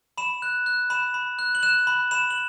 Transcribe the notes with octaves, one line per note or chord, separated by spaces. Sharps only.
B5 E7
F#6
F#6
B5 E7
B5
F#6
F#7
F#6 E7
B5 F#7
B5 E7
F#7